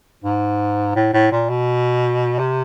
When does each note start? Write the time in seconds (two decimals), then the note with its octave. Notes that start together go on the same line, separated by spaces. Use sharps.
0.24 G#2
0.95 A2
1.13 A2
1.32 A#2
1.49 B2
2.39 C3